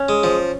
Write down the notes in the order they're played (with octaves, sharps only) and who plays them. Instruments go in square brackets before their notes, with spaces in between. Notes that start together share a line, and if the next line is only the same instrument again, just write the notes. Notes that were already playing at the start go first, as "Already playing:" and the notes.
Already playing: [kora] C#4
[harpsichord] G#3
F3